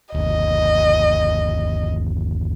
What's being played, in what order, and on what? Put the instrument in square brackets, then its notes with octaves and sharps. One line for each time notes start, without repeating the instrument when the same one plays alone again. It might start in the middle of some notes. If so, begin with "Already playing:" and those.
[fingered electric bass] G1 D#2 [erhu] D#5